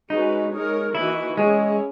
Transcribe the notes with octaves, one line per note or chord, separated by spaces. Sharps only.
G#3 C#4 D#4 F#4 B4
G#3 D#4 A#4 C#5
E3 A#3 D#4 E4 F#4 B4
G#3 C#4 E4 G#4 C#5